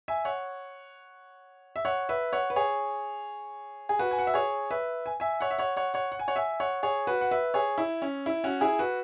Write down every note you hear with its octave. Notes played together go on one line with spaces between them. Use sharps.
E5 G#5
C#5 F#5
E5
C#5 F#5
B4 E5
C#5 F#5
B4
G#4 C#5
G#4
F#4 B4
G#5
F#5
E5
G#4 C#5
B4 E5
G#5
E5 G#5
C#5 F#5
E5
C#5 F#5
C#5 F#5
C#5 F#5
F#5
G#5
C#5 F#5
E5 G#5
C#5 F#5
G#4 C#5
F#4 B4
F#5
B4 E5
G#4 C#5
E4
C#4
E4
C#4 F#4
E4 G#4
F#4 B4